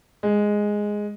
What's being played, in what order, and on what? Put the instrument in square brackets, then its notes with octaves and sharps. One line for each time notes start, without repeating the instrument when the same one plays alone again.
[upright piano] G#3